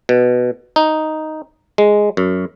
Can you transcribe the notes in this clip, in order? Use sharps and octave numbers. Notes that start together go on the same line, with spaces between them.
B2
D#4
G#3
F#2